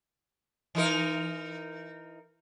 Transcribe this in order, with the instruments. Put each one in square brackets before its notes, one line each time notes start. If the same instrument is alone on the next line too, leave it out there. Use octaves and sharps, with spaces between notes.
[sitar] E3 D#4 A#4